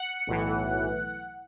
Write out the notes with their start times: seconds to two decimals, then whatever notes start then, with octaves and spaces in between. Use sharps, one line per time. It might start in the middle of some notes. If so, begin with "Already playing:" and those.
Already playing: F#5
0.27 B1 A2 E3